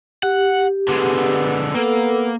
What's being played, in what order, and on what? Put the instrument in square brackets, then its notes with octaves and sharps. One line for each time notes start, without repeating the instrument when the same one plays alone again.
[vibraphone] G4 [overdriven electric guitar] F#5
[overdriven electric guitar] D3 G#3 [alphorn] B3
[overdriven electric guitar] A#3 [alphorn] B3 [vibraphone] A4 E6